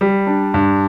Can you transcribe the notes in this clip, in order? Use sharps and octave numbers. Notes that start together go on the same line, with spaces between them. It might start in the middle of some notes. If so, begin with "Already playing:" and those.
G3
D4
G2